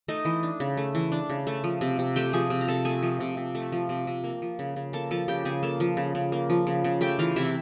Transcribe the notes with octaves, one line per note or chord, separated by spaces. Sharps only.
A3 D#4 D#5
E3
D4
C#3
A3
E3
D4
C#3
A3
F3
C3
C3
A3 G4 G5
F3 G#4 G#5
C3
A#5
C3 A4 A5
A3 G#4 G#5
F3
C3
C3
A3
F3
C3
C3
A#3
F3
C#3
C#3
A#3 A4 A5
F3 A4 A5
C#3 G4 G5
C#3 G#4 G#5
A#3 A4 A5
F3
C#3
C#3
A#3
F3
C#3
C#3
A3 G4 G5
E3 F4 F5
C3 E4 E5